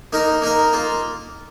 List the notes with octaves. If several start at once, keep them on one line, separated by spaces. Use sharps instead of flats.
A#3 D#4 A#4
A#3 D#4 A#4
A#3 F4